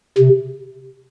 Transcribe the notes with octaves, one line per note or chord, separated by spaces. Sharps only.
C3